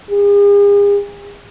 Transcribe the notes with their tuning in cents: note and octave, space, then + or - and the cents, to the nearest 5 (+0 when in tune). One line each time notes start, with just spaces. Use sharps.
G#4 -45